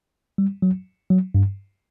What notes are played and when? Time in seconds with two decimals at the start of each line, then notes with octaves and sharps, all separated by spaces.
0.38 G3
0.62 F#3
1.10 F#3
1.35 G2